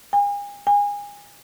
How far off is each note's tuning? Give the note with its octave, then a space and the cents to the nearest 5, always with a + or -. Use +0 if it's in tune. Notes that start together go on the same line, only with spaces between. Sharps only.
G#5 -40
G#5 -30